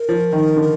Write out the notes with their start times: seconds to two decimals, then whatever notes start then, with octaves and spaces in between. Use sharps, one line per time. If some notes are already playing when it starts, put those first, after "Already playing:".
Already playing: A#4
0.09 F3
0.32 D#3
0.57 D3